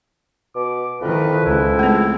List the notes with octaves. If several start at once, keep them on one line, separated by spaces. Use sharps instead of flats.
B2 D6
F2 D#3 E3 B4
C#2 E4
G#3 A3 C4